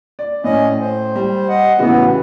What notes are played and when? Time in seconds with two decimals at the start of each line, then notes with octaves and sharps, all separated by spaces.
0.19 D5
0.44 A2 C#4 D#5
0.80 C5
1.15 G3
1.48 D#5 F#5
1.79 A2 C#3 E3 B3 F#4